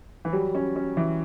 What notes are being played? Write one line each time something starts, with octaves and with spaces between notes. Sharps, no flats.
E3
F#3 G3
C#4
C#4
E3